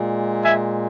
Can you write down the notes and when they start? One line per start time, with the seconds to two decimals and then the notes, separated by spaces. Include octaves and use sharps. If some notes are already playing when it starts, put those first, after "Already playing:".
Already playing: A#2 G#3
0.44 E5 G#5